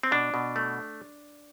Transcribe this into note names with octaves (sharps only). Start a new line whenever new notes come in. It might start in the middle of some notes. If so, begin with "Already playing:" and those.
C4
B2 D4
B2
A3